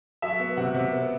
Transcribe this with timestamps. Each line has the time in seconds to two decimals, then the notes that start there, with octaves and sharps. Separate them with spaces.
0.22 F#3 E5
0.39 B3
0.57 C3 F#5
0.75 C3
0.92 B3